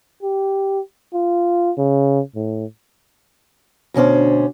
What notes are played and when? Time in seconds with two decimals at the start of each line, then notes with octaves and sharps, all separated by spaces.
0.23 G4
1.14 F4
1.78 C#3
2.36 A2
3.94 D2 B2 C#4 D4 C5